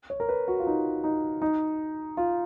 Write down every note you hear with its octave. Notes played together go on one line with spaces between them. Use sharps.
C#5
A#4
B4
F#4
F4
D#4
D#4
D#4
F4